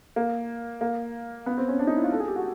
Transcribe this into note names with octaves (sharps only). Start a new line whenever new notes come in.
A#3
A#3
B3
C4
C#4
D4
D#4
E4
F4
A4
G#4
G4
F#4